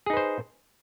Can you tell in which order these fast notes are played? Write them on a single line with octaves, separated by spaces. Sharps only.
G#4 D#4 B4 C5